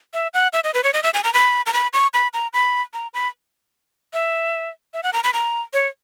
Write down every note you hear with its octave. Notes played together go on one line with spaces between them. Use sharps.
E5
F#5
E5
D#5
B4
C#5
D#5
E5
G#5
A#5
B5
A#5
B5
C#6
B5
A#5
B5
A#5
B5
E5
E5
F#5
A#5
B5
A#5
C#5